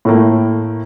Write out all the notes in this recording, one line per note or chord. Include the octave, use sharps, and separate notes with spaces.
A2 A3 A#3